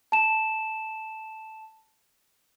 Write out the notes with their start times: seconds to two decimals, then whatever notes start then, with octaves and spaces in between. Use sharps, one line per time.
0.12 A5 E7